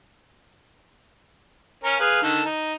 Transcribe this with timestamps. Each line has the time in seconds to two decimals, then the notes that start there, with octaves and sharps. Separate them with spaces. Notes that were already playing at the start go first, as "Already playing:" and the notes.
1.84 C#4 A#4
2.00 G#4 B4 F5
2.22 D3 D#3 A4
2.45 D#4